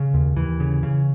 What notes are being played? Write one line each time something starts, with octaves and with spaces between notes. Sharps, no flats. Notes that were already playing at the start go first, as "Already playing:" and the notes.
Already playing: C#3
D#2
D#2 E3
C#3
C#3